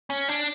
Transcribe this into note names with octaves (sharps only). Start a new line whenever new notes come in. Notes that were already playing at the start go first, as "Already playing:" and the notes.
C#4
D4